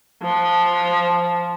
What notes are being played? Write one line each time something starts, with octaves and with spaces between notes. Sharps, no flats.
F3